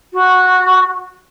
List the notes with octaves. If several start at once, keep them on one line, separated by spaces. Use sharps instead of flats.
F#4